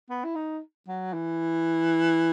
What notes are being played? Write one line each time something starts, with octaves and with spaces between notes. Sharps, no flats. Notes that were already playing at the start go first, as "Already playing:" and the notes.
B3
E4
D#4
F#3
E3